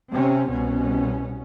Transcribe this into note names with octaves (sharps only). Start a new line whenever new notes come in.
C3 C4 C#4
C2 B2 C#4